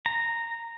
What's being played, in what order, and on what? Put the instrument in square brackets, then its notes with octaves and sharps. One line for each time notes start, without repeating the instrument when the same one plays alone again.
[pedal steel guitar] A#5